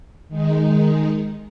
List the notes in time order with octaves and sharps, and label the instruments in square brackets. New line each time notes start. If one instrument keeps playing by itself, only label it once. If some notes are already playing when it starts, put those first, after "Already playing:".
[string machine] D#3 G#3 D#4